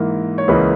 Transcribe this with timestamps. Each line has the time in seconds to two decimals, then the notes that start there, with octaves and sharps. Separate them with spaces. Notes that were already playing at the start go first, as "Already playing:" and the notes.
Already playing: G#2 E3 A#3 A#4
0.38 C#5
0.48 C#2 C#3 E3 A#3 B4